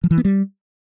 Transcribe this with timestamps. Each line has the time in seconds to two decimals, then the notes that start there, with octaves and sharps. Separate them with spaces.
0.04 F3
0.11 E3
0.18 B3
0.25 G3